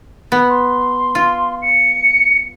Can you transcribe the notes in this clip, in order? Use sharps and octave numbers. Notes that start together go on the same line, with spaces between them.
B3
C6
F4
C#7